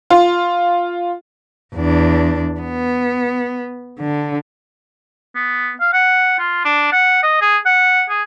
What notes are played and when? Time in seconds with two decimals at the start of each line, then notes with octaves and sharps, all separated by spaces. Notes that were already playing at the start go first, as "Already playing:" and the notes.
0.10 F4
1.75 E2 D4
2.61 B3
4.00 D3
5.35 B3
5.81 F5
5.93 F#5
6.39 F4
6.65 D4
6.93 F#5
7.23 D#5
7.42 G#4
7.66 F#5
8.10 G#4